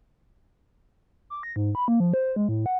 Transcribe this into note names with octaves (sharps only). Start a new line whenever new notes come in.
D6
A#6
G#2
B5
A#3
F3
C5
G#3
A2
F#5